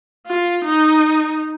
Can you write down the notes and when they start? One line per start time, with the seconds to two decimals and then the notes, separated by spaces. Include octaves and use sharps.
0.27 F4
0.65 D#4